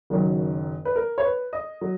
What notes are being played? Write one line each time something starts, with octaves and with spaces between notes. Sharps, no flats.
F#1 F#2 D#3 F#3
B4
A#4
C#5
B4
D#5
F#3